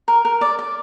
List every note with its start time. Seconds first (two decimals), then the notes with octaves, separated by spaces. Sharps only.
0.08 A#4
0.25 A#4
0.41 D5
0.59 D5